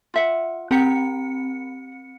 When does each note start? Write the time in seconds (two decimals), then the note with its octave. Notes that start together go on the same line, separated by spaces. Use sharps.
0.14 F4 E5 F#5
0.71 C4 G4 F#5 A#5 C#7